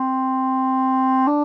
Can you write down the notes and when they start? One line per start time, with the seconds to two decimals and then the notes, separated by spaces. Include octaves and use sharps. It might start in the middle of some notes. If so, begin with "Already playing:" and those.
Already playing: C4
1.27 D4